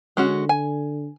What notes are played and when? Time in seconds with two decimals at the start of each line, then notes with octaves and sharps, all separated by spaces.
0.17 D3 G#3 C#4 F#4
0.49 G#5